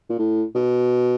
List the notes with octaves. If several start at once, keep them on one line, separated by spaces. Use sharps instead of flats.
A#2
A2
B2